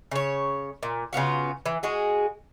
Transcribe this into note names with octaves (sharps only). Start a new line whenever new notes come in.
C#3 C#5
A#2
C#3 B3 F4 F#4
E3
G#3 F#4 G#4